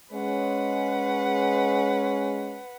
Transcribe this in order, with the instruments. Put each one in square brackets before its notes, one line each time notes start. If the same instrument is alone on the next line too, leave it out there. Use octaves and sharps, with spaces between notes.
[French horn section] G#3 C#4 [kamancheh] B4 F#5